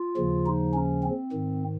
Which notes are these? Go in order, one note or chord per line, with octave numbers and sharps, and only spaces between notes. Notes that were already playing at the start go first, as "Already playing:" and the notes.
Already playing: F4
D#2 C#3 F3
D#4
C#4
C4
G#2 D#3